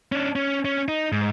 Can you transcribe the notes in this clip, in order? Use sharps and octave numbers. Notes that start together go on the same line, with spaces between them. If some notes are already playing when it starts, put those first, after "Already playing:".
C#4 D4
C#4
C#4
D#4
G#2